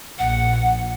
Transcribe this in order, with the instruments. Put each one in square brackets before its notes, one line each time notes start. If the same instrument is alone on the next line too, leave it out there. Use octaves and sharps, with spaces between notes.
[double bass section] A#1 [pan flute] F#5